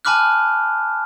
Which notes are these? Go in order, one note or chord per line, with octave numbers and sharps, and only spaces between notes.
G#5 A5 B5 D6 F6 F#6